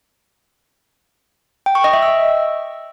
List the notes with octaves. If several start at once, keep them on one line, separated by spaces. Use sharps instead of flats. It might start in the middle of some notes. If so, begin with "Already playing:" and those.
G5
C#6
D#5
E5
E6